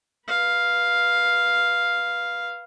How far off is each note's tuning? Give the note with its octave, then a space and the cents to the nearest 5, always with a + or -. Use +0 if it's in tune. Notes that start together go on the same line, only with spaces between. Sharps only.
B4 -15 F5 +0